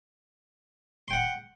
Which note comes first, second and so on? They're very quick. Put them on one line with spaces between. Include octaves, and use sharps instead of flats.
C6 G5 F#5